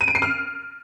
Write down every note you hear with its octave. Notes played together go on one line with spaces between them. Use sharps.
D#7
D7
C7
F6